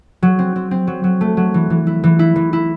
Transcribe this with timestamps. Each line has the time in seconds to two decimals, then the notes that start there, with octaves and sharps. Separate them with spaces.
0.22 F#3
0.39 C4
0.56 C4
0.71 C4
0.87 F#3
1.04 F#3
1.21 A3
1.37 F#3
1.54 E3
1.70 E3
1.87 E4
2.04 E3
2.19 E4
2.36 E3
2.53 E4